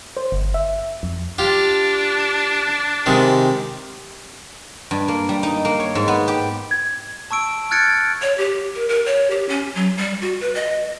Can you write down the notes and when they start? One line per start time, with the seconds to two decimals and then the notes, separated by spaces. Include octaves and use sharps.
0.17 C5
0.32 G1
0.54 E5
1.03 F2
1.38 D4 F4 G4
3.06 C3 D#3 G#3
4.91 G2
5.08 A#3
5.29 G3
5.43 D#4
5.65 A#3
5.80 C#5
5.95 G#2
6.08 B3
6.28 G4
6.71 G#6
7.31 A5 C#6 E6 D7
7.71 F6 F#6 G#6 A6 C#7 D7
8.22 C#5
8.38 G4
8.75 A#4
8.89 A#4
9.06 C#5
9.30 G4
9.49 C#4
9.75 F#3
9.97 G3
10.21 F#4
10.41 B4
10.55 D#5